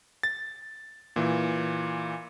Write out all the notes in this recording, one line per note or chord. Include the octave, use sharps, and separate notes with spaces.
A6
A#2 E3